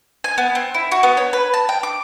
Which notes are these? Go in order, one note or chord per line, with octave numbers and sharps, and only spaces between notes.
G#5
B3
C4
E4
F#4
B3
C#5
B4
A5
G5
D6